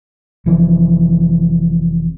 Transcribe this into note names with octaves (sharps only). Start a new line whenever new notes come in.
F1 F2 E3